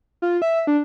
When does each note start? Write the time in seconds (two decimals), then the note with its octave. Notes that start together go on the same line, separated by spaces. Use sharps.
0.22 F4
0.42 E5
0.67 D4